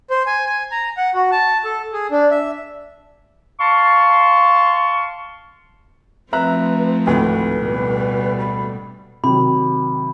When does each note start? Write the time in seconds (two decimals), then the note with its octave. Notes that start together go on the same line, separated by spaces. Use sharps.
0.10 C5
0.27 G#5
0.46 G#5
0.72 A#5
0.97 F#5
1.15 F#4
1.32 A5
1.65 A4
1.93 G#4
2.11 D4
2.31 E5
3.59 F5 A5 C6 C#6
6.33 F3 A3 C4 B4 E5 A#5 F#6
7.07 G#1 D2 A2 B4
7.57 B2 G3
8.39 B5
9.24 C3 D#3 F#3 B5